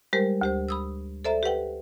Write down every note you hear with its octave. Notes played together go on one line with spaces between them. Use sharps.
G3 G#3 G4 A#4 C5
D2 G4 C5
B5 D#6 E6
A4 C5 D5 E5 A#5
G4 B4 F#5 G5